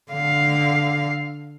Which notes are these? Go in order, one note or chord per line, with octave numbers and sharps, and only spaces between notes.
D3 F5